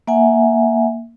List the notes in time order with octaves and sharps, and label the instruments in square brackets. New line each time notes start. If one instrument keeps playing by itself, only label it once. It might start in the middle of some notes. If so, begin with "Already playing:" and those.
[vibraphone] A#3 E5 F#5 G#5